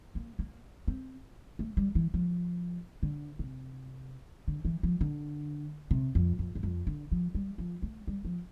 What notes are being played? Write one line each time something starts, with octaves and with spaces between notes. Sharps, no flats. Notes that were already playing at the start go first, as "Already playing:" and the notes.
A#3
A#3
C4
A3
G3
E3
F3
D3
C3
D3
E3
F3
D3
C3
F2
F2
E2
F2
D3
F3
G3
F3
A3
G3
F3